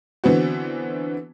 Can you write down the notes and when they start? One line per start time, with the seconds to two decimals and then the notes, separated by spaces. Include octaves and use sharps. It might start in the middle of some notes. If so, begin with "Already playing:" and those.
0.24 D3 E3 B3 C4 F#4